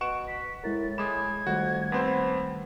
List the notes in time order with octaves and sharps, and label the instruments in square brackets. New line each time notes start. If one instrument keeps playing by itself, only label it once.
[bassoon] B2 [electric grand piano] F#5 C#6 E7 [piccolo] D7
[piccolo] B6
[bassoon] A2 [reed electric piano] G#3 E4 A#4 [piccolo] A6
[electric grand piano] G#3 E7 [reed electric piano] B5 D6 D#6 [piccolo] G#6
[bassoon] F2 [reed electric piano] D#3 G3 A3 [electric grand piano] F#4
[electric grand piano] D#2 C4 C5 [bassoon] B3